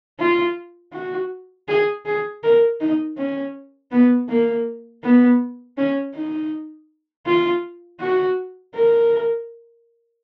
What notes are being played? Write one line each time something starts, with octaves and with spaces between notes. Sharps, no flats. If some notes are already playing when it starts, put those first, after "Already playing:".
F4
F#4
G#4
G#4
A#4
D#4
C#4
B3
A#3
B3
C#4
D#4
F4
F#4
A#4